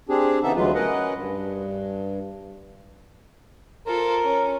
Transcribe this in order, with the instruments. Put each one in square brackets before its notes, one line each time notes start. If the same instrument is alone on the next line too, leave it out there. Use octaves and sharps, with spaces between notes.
[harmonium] C4 D4 G4 G#4
C#3 E3 B3 D#4 A4 E5
D2 E3 F#3 G#3 F4 B4
C#4 A#4 B4 D#5 F#5
G2
[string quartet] F4 A4 C5 [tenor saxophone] A#4
[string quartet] C#4